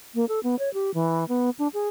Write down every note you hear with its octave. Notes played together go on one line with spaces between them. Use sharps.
A#3
A4
B3
C#5
G4
E3
B3
D4
G#4